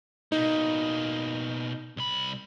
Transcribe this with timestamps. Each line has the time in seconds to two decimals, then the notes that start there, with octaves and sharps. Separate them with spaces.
0.32 B2 A#3 D#4
1.97 C2 B5